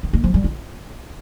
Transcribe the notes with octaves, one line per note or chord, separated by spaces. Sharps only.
D#3
A#3
F3
G3
F4